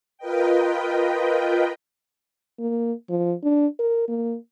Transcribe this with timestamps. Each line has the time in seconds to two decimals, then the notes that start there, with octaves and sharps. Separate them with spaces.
0.18 F4 A#4 B4 D#5 G5
2.59 A#3
3.09 F3
3.43 D4
3.79 A#4
4.08 A#3